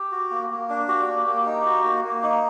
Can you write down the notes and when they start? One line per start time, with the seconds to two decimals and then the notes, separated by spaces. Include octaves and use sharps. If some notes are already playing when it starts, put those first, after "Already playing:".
Already playing: G4
0.12 F#4
0.31 A#3
0.50 A#3
0.70 D4
0.88 F#4 G4
1.07 A#3
1.26 A#3
1.46 D#4
1.66 F#4
1.84 A#3
2.04 A#3
2.23 D#4